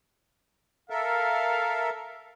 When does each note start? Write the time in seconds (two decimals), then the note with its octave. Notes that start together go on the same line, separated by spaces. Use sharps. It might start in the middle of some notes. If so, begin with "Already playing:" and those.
0.90 A4 A#4 E5 F5